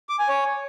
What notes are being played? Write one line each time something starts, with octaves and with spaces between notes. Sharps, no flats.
D6
G#5
C#5